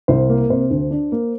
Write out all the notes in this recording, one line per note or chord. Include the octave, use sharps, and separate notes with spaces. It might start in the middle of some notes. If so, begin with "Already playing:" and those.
C2 C5
A#3
C3 C5
D2
D4
A#3